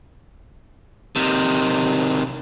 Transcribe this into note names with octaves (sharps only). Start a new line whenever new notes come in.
C3 D#3